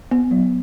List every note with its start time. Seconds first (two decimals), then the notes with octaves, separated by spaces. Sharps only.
0.11 B3
0.31 F#3